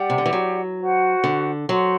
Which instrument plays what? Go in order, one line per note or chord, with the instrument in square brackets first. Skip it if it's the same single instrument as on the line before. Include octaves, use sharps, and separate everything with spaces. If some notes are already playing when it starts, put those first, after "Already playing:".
Already playing: [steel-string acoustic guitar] G3 [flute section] G4 D5 F#5
[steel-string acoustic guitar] C3
D3
E3
F#3
[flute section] F#4 C5 F#5
[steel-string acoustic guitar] D3
[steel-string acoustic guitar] F#3 [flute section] F#4 C5 F#5 C6